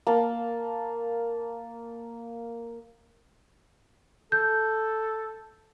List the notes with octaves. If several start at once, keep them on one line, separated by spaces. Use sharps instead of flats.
A#3 A5
A4 G6